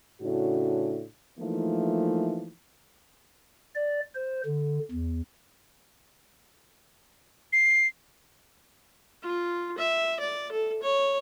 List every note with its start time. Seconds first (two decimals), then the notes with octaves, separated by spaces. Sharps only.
0.22 A2 C#3 D4 F#4
1.39 E3 F3 A3 A#3 D#4
3.75 D5
4.15 C5
4.45 D3
4.91 E2
7.53 C7
9.23 F4
9.78 E5
10.20 D5
10.52 A4
10.83 C#5